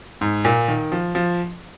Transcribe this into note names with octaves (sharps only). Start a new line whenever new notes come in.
G#2
A#2
D#3
F3
F3